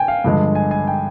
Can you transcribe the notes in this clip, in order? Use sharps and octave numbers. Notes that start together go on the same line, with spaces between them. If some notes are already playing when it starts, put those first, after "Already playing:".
Already playing: G5 G#5
F5
G2 D3 F3 G#3
G#5
G#5
G5